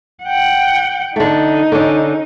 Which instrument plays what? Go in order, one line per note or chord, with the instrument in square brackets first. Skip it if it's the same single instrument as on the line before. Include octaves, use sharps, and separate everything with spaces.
[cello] F#5 G5
[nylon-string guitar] D3 A3 [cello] D#4
[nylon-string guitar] D3 C#4